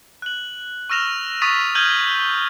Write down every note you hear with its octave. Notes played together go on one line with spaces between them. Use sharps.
F#6 F#7
C#6 E6 F6 A#6 E7 F7
C#6 D#6 A6 B6 D#7 F7
F6 G6 G#6 D#7 F#7 G7
F#7